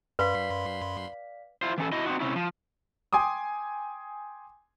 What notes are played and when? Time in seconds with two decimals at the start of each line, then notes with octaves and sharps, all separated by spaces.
0.19 F#2 B4 D5 F5 B5 C6 B6
1.62 E4 F4 C5
1.78 E3 C#4 A4
1.92 E4 F#4 D#5
2.06 C4 D#4 F#4
2.20 C3 C#4 E4
2.36 F3
3.13 G5 G#5 C6 D6 D#6